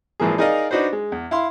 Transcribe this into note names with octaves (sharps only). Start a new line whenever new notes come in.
G#1 E3 F3 A#3 G#4
D#4 G#4 A#4 D5 D#5 F5
D4 D#4 F#4 B4 C5
G#3
E2
E4 F5 C6